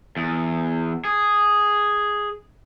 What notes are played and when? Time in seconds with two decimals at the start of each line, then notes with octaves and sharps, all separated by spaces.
0.17 E2
1.05 G#4